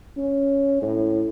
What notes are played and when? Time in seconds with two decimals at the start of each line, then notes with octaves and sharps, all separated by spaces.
0.17 C#4
0.82 A2